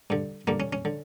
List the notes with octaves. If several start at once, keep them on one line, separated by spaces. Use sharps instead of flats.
G2 D3
G2 D3 A#3
C#4
C#4
D3